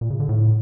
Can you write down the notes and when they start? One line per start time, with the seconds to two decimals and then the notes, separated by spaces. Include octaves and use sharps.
0.01 A#2
0.10 C#3
0.20 D3
0.29 A2